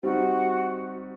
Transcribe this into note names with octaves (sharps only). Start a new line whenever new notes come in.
G3 C4 D#4 F#4